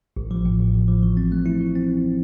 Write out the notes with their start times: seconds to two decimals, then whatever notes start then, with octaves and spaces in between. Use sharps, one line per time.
0.17 A1
0.31 F3
0.46 A2
0.60 A1
0.74 A1
0.88 F3
1.03 E3
1.17 C4
1.32 A3
1.46 E4
1.61 E3
1.75 C4